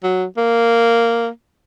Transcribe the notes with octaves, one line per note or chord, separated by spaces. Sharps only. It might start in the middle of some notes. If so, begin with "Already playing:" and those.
F#3
A#3